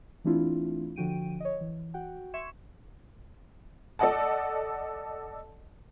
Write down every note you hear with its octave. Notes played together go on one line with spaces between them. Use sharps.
E3 A3 C4 D4 E4 F4
D3 F3 F#4 G5 D7 D#7
C#5 D#5
E3
F#4 F#5 G5
E5 C6 C#6 G#6 C#7 E7
A4 D5 D#5 F#5 A5